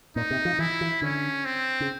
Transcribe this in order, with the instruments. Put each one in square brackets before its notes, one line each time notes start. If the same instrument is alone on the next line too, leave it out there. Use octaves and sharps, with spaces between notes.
[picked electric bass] A#2 [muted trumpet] D#4
[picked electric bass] C3
F3
[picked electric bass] E3 [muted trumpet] E4
[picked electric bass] E3
[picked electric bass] D3 [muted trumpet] C#4
[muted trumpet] C4
[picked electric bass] C#3